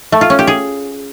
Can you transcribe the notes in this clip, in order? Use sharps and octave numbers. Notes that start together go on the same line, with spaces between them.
A3
F4
C#4
G4
G#4